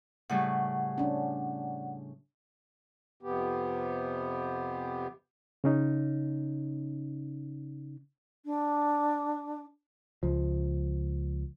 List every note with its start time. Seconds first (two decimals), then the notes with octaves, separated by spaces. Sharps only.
0.30 A2 C#3 G3 F#5
0.98 C#4 D4
3.23 F2 C3 B3 G4
5.64 C#3 C#4 D#4
8.45 D4
10.23 C#2 F3